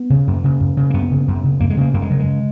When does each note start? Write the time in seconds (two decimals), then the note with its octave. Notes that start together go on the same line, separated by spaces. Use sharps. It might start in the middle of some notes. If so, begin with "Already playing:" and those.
Already playing: B3
0.10 C#3
0.27 F#2
0.44 C#3
0.60 F#2
0.77 C#3
0.90 A#3
0.93 F#2 B3
1.11 C#3
1.28 F#2
1.44 C#3
1.60 F#2 A#3
1.70 G#3
1.77 C#3 A#3
1.94 F#2 A#3
2.02 G#3
2.11 C#3 F#3
2.19 G#3